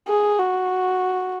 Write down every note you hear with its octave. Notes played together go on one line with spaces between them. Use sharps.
G#4
F#4